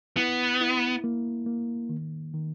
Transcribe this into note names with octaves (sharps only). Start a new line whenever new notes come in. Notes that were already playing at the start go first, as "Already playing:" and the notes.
B3 E4
E4
A#3
A#3
D#3
D#3